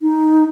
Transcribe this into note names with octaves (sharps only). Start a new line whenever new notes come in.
D#4